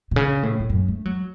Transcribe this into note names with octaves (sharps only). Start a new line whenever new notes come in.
B2
C#3
A2
A2
F#2
A3
F#3